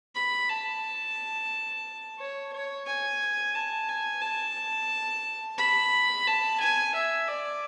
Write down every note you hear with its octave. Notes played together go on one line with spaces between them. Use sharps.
B5
A5
C#5
C#5
G#5
A5
G#5
A5
B5
A5
G#5
E5
D5